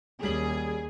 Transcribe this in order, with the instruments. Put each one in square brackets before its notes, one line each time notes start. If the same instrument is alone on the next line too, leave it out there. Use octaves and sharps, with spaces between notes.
[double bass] D#2 [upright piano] G3 C#4 F#7 [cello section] G#4